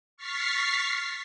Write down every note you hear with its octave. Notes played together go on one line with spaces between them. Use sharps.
C#6 F6 A6 B6 C7